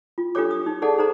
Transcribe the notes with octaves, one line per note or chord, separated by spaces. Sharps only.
F4
D4 F4 G4 A4 C#5 D6
D#6
D#4
D#4 G#4 A4 D5 F#5 A5
D#4 A4 C5 A#5